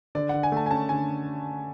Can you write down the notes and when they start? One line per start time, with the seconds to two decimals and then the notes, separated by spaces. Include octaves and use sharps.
0.15 D3 D5
0.29 D3 F#5
0.43 G#5
0.52 A3 A5
0.66 G#5
0.71 C#4 A5
0.89 D3 G#5